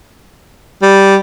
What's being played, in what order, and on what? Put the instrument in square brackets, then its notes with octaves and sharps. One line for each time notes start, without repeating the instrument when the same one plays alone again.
[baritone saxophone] G3